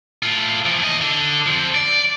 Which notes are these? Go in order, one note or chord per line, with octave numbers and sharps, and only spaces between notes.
A2 F4
E3 F3
D#2 D#5
D3
F3 C4
D5